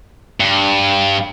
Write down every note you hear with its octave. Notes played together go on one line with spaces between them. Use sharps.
G2